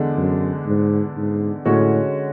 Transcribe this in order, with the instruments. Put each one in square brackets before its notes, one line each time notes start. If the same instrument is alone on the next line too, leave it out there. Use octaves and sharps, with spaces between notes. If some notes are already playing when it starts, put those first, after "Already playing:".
Already playing: [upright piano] E2 D3 G#3 D4
[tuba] F#2
G#2
G#2
[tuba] A2 [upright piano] D3 G#3 C#4 F#4 C#5